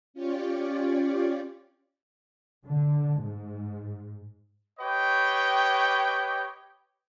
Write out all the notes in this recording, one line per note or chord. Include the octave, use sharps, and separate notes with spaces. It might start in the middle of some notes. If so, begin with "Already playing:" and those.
C#4 F4 G4 C#5 D5
D3
G#2
G4 B4 C#5 D#5 G5